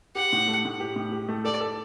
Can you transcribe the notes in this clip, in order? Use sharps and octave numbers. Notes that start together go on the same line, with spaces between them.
G4 F#5
A2
A3
A2
G4
A2
G4
A3
A4 D5
A4